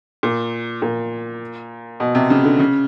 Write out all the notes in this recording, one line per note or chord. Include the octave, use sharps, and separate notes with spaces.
A#2
A#2
B2
C3
C#3
D3
C#3